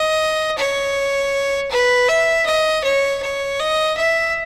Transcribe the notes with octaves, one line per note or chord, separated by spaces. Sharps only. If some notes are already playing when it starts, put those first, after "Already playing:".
Already playing: D#5
C#5
B4
E5
D#5
C#5
C#5
D#5
E5